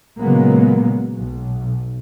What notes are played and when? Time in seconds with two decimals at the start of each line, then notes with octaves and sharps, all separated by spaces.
0.19 A#2 C#3 F#3 G#3 A#3 B3
1.17 B1